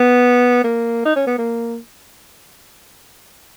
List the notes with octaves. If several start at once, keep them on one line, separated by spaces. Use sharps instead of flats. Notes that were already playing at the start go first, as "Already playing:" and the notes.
Already playing: B3
A#3
D#4
C#4
B3
A#3